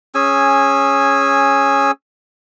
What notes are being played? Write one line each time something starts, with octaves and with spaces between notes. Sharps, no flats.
C#4 G#4 G#5 E6